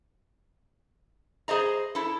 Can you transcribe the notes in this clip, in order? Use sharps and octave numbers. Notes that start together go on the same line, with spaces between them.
G#4 C5 D#5 A#5
E4 A4